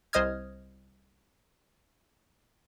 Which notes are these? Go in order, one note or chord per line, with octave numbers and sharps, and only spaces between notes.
C2 C5 D#5 D#6 F6 G#6